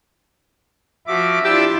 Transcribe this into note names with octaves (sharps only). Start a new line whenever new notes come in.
F3 F#4 E5 D6
D4 E4 F4 G4 D6 E6